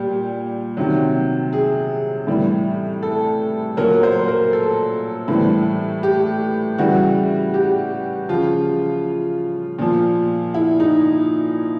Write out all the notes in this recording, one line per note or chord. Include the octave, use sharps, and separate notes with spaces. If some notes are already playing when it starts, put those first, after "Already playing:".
Already playing: A#2 G3 G4
C3 D#3 F#3
G#4
A2 E3 G3
A4
A#2 F#3 A#4
C5
A#4
A4
A2 E3 G3
G4
C#3 E3 G3 F#4
G4
C#3 F3 F4
A#2 F3
E4
D#4